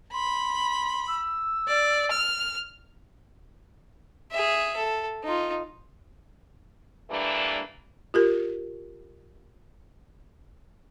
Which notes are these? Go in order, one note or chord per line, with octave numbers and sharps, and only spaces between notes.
B5 C6
E6
D5
F6
G#4 E5
A4
D#4 F4
E3 G3 A3 A#3 D4 B4
F4 G4 A#4